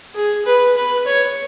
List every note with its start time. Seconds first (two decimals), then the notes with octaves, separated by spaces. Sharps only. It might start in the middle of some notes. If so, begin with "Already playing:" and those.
0.14 G#4
0.46 B4
0.76 B4
1.07 C#5